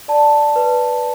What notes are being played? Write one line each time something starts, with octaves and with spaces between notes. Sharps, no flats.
D5 A5
B4